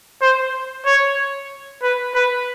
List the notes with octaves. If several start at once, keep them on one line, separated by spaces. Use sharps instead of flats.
C5
C#5
B4
B4